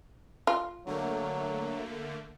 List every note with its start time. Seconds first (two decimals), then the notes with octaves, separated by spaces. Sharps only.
0.47 F4
0.87 D3 F#3 A3 A#3